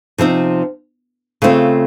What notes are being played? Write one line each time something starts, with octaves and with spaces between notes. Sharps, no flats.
C3 F3 C4 D#4
C#3 A3 C4 F4